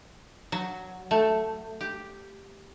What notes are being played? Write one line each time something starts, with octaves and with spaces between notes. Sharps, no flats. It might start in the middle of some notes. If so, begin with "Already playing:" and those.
F#3
A3
G4